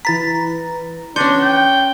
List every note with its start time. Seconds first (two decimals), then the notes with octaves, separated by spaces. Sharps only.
0.05 E3 B4 A#5 A6 B6
1.16 C#4 D4 D#5 C6 G6 C#7
1.41 G5